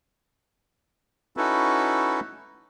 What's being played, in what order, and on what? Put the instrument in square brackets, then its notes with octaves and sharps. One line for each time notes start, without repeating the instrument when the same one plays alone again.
[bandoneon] C#4 D#4 E4 F#4 A4 B4